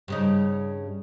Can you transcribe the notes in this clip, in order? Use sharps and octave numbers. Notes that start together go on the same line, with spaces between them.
G2 C#3 D#4